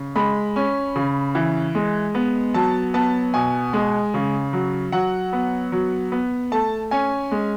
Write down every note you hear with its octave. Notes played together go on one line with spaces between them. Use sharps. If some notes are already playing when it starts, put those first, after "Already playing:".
Already playing: C#3
G#3 B5
C#4
C#3
E3
G#3
B3
F#3 A5
B3 A5
B2 G#5
G#3
C#3
F#3
F#3 F#5
B3
F#3
B3
A3 A5
C#4 G#5
G#3